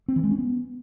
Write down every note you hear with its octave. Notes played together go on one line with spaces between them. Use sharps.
C4
E3
G#3
C#4
B3